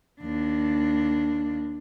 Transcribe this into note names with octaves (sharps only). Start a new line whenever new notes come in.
D#2 D4